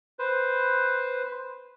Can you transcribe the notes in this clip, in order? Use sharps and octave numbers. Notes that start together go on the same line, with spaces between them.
B4 C5